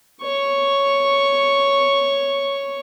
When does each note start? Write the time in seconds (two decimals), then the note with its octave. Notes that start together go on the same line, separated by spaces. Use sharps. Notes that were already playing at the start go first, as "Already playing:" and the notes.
0.21 C#5 C#6